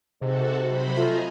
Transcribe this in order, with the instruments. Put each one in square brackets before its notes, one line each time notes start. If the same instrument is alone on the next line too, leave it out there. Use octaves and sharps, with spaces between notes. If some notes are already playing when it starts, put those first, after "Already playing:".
[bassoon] G#2 [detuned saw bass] C3 [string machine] F#4 A4
[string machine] F#3 C5 B5
[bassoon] A3 [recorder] F4 [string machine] D#5 G#5 A#5